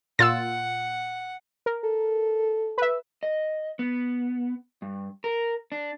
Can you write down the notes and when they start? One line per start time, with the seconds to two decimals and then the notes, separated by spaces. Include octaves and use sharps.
0.19 A#2 F4 F#5 E6 A6
1.66 A#4
1.84 A4
2.78 B4 E5
3.23 D#5
3.79 B3
4.82 G2
5.24 A#4
5.72 D4